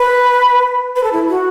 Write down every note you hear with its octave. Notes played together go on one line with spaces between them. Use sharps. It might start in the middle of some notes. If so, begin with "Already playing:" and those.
Already playing: B4
B4
A4
E4
F#4